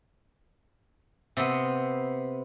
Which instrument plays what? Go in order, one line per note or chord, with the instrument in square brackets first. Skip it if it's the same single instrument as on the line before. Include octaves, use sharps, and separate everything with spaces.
[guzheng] C3 B3